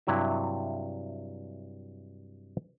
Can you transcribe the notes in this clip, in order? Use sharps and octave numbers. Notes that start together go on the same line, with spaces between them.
G2 C3 F#3 E4 E5